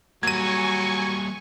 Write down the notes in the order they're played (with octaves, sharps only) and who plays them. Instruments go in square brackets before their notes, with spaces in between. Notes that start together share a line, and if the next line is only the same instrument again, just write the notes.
[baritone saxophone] F#3 [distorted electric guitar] G3 A#3 [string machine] G#5 C#6 [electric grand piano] G#6 D#7